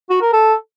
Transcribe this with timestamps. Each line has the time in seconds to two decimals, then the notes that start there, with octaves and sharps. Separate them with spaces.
0.10 F#4
0.21 A#4
0.33 A4